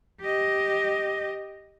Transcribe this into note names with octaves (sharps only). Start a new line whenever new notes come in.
G4 D#5